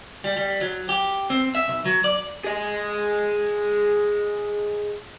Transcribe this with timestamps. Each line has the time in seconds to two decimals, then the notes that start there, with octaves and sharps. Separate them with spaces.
0.24 G3
0.37 G3
0.61 F#3
0.89 G4
1.30 C4
1.55 E5
1.68 B1
1.85 F#3
2.04 D5
2.44 G#4 D#5